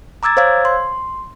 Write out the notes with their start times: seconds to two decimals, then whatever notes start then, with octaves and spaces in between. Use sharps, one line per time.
0.23 A#5 D6 E6 G#6 A6
0.37 C5 C#5 F5 E6 G#6
0.65 C6